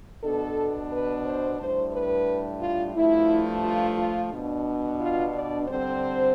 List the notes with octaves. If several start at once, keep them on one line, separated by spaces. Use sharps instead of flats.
B2 B3 D4 A4
B4
C5
A2 G3 D4 C5
B4
F4
G2 F3 A3 E4
F4
F4
B2 B3 D4
F4
D5
D3 G3 C4 C5